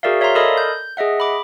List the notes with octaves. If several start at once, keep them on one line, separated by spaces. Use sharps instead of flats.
F#4 G#4 A#4 D5 E5 F5
C#5 E5 F5 A#5 C6
A4 A#4 D5 D#5 B5 D#6
G6
G#4 D#5 E5 F#5
B5 D6